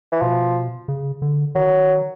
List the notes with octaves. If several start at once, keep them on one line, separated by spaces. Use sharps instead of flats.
E3
B2 F3
C#3
D3
D#3 F#3